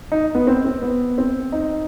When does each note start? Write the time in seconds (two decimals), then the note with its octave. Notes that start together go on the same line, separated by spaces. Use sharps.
0.12 D#4
0.35 B3
0.47 C4
0.65 C4
0.82 B3
1.18 C4
1.52 D#4